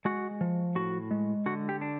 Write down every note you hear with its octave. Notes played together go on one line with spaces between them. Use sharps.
G#3 F#4
F3
A2 F#4
G#3
D3 F#4
G4
D4